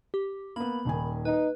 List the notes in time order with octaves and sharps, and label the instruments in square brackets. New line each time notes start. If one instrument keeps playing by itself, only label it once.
[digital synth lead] G4
[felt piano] A#3 B3 [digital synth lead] B5
[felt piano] D#1 D#3 G#5
[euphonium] D#4 [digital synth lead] B4